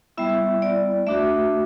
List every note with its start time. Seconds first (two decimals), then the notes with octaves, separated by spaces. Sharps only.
0.17 G3 B3 E4 E5
0.62 D5
1.07 A3 D4 F#4 E5